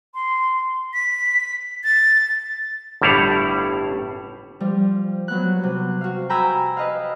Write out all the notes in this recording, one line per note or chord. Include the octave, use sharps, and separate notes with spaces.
C6
B6
A6
G1 A2 G3 E4 F5 F#5
F3 G3
F#3 B3 F#6
C3
F#4 F5
G5 G#5 A#5 B5 E6 G6
B4 D#5 F5